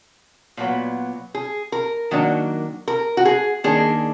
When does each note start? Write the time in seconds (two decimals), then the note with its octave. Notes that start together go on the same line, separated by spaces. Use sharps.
0.57 A#2 F#3 B3
1.34 G#4
1.72 A#4
2.11 D#3 F#3 A#3 D4
2.88 A#4
3.17 F#4
3.25 G#4
3.64 D#3 A#3 D4 G#4